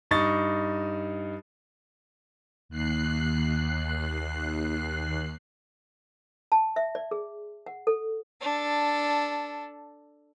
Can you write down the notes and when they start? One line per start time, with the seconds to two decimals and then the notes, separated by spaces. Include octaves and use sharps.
0.11 G2 D#4 C#6 A6
2.69 D#2 F#6 C7
6.52 A5
6.76 E5
6.95 D5
7.11 G#4
7.66 F#5
7.87 A4
8.41 D4 A4